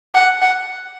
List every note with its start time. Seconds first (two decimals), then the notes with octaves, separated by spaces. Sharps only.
0.15 F#5
0.42 F#5